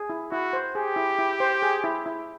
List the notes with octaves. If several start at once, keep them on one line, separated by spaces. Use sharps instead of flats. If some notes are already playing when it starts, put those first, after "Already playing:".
Already playing: G#4
E4
E4 F#4
C5
G4 G#4
E4
E4
C5
G#4
E4
E4